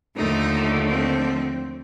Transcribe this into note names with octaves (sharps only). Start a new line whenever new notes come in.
D#2 D3 F3 A3 D#4
C4